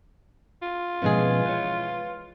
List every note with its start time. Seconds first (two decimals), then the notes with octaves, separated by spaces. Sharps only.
0.62 F4
1.02 B2 E3 F3 G#3 C#4 G#4
1.46 B4 C#5